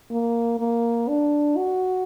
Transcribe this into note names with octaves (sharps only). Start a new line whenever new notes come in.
A#3
A#3
D4
F#4